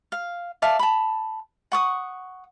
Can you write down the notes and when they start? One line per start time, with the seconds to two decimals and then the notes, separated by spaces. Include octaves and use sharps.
0.12 F5
0.62 D5 E5 F5 A5
0.79 A5 B5
1.72 F#5 C#6 D#6